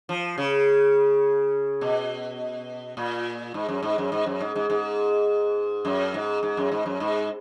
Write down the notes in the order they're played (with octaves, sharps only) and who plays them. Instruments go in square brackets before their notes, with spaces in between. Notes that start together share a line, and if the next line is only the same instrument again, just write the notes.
[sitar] F3
C#3
B2
A#2
G#2
F#2
G#2
F#2
G#2
F#2
G#2
G#2
G#2
F#2
G#2
G#2
F#2
G#2
F#2
G#2